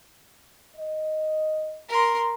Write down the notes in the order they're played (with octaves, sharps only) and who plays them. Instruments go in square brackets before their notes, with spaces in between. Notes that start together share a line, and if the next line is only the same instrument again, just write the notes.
[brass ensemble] D#5
[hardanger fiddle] A#4 C6